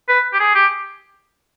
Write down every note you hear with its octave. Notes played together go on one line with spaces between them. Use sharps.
B4
G4
G#4
G4